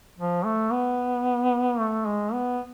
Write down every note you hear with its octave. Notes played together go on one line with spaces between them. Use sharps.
F3
A3
B3
A3
G#3
B3